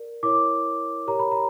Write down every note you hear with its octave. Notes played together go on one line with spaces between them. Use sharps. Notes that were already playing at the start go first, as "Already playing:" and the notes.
Already playing: A#4 D5
E4 A#4 C#5 D6
G4 A#4 C#5 A#5
B5
A#5